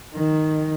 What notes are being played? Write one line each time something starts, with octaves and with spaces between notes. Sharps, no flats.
D#3